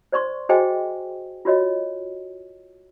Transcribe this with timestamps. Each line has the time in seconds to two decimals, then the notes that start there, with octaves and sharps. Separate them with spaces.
0.12 C5 D5 C6 C#6
0.49 F#4 G#4 C5 D#5 G5 G#5
1.45 F4 F#4 C#5 D#5